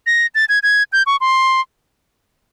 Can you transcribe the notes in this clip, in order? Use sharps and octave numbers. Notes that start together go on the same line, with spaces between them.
A#6
A6
G#6
G#6
G6
C#6
C6